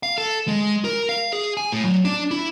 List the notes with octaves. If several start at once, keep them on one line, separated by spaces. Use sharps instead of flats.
F5
A4
G#3
A#4
F5
G#4
G#5
A2
F#3
D4
E4